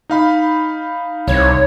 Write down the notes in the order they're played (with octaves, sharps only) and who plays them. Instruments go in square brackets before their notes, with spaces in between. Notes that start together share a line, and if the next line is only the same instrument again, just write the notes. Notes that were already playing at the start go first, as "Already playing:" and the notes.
[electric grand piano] D#4 F5 B5
[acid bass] C2 [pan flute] C#5